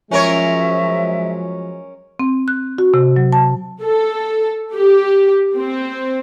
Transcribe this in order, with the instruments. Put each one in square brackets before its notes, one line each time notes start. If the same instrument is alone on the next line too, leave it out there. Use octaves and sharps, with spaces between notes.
[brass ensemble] F3 F#3 G#3 [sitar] C#4 A#4 C#5 [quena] E5
[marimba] C4
F#6
F#4
C3
F#3
A5
[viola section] A4
G4
C4